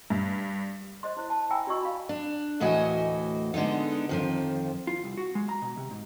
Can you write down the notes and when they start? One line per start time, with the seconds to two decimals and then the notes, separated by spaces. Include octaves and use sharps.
0.10 G2
1.03 C5 D#5 C6
1.17 E4 C5
1.30 A5
1.50 E5 G5 G#5 A#5 B5 E6
1.67 F4 F#4 D5 D#5 C#6 E6
1.82 F5 B5
2.09 D4
2.60 D2 A2 E3 F#4 D#5 G#5
3.54 D3 G#3 B3 D#4
4.09 F2 D#3 F3
4.87 F4
5.04 C2
5.17 F#4
5.35 G#3
5.49 A#5
5.62 B2
5.77 C3
5.91 G#2